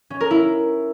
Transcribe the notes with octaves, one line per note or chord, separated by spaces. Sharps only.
C#4
A#4
E4